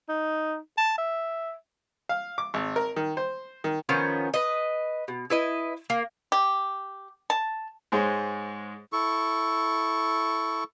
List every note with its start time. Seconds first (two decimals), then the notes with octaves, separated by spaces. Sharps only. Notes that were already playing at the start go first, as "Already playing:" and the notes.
0.09 D#4
0.78 A5
0.98 E5
2.09 F5
2.38 D6
2.54 G#1
2.76 A#4
2.96 D#3
3.17 C5
3.64 D#3
3.89 D#3 F3 B3 C#4
4.34 B4 D#5
5.08 B2
5.30 E4 B4 D#5
5.90 A#3
6.32 G4
7.30 A5
7.92 G#2 G#3 C5 C#5
8.93 E4 A4 C#6